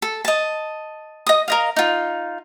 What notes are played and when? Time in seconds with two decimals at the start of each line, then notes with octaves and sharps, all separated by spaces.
0.02 A4
0.25 D#5 A5
1.27 D#5 D#6
1.48 A#4 D#5 F5
1.76 D#4 F4